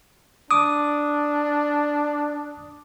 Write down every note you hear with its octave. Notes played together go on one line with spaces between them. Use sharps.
D4 D6 D#6